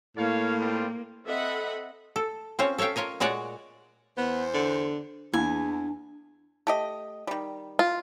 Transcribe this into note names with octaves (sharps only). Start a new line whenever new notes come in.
A2 A#3 C#5 F5
G3 C4 F4
C4 A4 D#5 E5 F#5 B5
A4
C4 C#4 F4 C5 C#5
A4 C#5 E5 F5 G5
F4 A#4 C#5 D#5
A#2 G#3 F#4 C#5 D5 F#5
E2 B3 C5
D3
E2 A#3 D4 E4 G#5
A3 G4 D#5
D#3 G3
F4